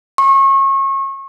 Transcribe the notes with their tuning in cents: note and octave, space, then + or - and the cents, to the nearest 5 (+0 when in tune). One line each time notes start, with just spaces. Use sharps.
C#6 -30